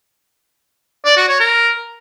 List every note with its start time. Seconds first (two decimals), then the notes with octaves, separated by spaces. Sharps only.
1.05 D5
1.17 F#4
1.28 C#5
1.40 A#4